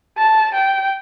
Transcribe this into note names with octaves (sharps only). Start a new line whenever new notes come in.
A5
G5